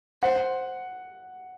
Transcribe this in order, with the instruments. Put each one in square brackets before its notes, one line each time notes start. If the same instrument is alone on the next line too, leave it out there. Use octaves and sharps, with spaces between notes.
[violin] C5 [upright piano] F#5